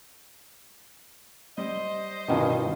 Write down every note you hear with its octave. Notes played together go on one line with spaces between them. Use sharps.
G3 C5 D#5
G2 B2 D#3 E3 C#4 F4